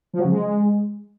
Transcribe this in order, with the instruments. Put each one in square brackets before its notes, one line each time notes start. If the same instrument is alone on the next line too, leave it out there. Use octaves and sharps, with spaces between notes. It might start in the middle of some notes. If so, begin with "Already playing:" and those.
[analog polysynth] F3
F#3
C#3
G#3